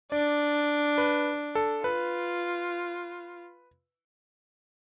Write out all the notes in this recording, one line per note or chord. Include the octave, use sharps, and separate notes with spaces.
D4 D5
B4
A4
F4 B4